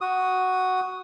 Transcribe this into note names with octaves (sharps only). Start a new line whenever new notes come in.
F#4 D#6